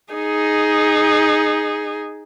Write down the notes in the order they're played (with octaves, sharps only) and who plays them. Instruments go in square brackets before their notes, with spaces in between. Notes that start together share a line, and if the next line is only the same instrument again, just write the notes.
[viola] D#4 [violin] G#4